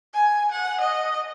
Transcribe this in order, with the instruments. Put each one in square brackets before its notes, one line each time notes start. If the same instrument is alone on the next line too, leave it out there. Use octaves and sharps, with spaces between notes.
[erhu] G#5
F#5
D#5